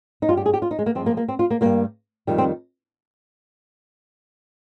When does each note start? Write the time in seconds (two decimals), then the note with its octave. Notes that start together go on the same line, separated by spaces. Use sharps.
0.22 D#4
0.29 G2 G3 F4
0.37 G4
0.46 G#4
0.54 G4
0.62 F4
0.71 D#4
0.79 G#3
0.86 A#3
0.95 G2 F3 G#3 C4
1.06 A#3
1.17 A#3
1.28 C4
1.39 F4
1.51 A#3
1.61 G2 G3 A#3
2.27 F2 D#3 G3
2.38 C4